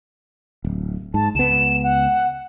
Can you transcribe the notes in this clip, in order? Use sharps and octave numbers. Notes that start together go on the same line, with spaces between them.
D1
G#2 A5
C#2 B3 E7
F#5